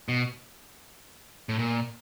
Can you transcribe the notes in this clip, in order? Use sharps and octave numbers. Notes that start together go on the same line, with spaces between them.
B2
A2
A#2